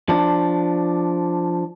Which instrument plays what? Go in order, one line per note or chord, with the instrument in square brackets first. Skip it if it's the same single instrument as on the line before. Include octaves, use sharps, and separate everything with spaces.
[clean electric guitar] F3 D4